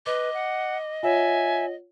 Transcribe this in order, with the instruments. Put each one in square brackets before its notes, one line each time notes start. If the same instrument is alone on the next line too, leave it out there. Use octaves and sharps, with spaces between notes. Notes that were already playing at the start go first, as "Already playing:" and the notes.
[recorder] B4 [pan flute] D#5 [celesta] D6
[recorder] F#5
[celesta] F4 C#5 F#5 [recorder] E5 [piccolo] G#5